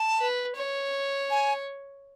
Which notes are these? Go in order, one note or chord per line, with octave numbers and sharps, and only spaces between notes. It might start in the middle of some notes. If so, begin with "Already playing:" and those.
Already playing: A5
B4
C#5
G#5